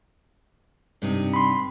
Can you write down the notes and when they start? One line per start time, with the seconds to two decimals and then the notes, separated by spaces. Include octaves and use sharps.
1.02 G2 C3 D#4
1.34 B5 C6